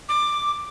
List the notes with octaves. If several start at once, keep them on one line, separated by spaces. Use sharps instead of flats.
D6